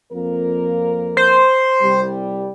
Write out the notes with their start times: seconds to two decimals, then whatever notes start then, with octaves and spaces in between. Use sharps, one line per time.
0.12 F2 A#3 A#4
1.17 C5
1.81 C2 G3